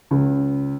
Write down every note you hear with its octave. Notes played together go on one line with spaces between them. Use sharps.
C#2